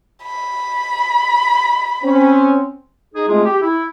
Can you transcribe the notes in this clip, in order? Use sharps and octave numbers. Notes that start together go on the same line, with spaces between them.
B5
C4 C#4
D#4 G#4
G#3 A3 C4 F4 G#4
G4
E4